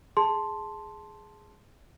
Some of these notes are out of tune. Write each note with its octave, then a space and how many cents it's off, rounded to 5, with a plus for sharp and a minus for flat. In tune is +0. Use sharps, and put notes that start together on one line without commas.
G#4 +0 A5 +0 C6 +0